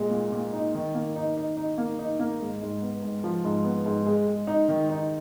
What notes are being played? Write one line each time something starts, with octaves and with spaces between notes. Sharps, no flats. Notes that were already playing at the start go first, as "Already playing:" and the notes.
Already playing: A#2 G#3
A#2
A#2
D#4
D#3
A#3
D#4
D#4
D#4
A#3
D#4
A#3
G#2
G#2
B3
G#2
F3
G#2
B3
G#2
G#3
G#3
D#4
D#3
D#4